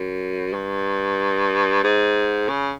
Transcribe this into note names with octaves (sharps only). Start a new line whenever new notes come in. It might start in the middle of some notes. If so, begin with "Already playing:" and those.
Already playing: F#2
G2
G#2
C#3